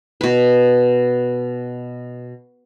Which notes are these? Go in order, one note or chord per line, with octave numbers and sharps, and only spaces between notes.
B2 B4